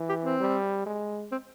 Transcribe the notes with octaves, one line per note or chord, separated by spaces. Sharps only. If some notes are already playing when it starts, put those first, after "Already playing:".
Already playing: E3
G4
C4
G3
G#3
C4